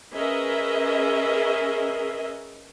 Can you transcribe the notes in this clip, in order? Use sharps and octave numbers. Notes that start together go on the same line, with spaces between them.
C#4 G#4 A#4 B4 D#5 E5